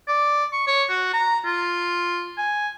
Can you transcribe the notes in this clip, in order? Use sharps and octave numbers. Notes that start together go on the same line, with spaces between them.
D5
C#6
C#5
F#4
A#5
F4
G#5